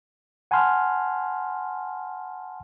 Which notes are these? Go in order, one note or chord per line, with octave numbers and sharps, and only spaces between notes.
F#5 G#5 A5 B5 C6 F6